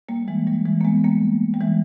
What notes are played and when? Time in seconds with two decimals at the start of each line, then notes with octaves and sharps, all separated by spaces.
0.09 G3 A#3
0.28 E3 G#3
0.47 G3 A#3
0.65 E3 G#3
0.81 A#3
0.85 G#3 B3
1.04 G3 A#3
1.54 G3
1.60 E3 G#3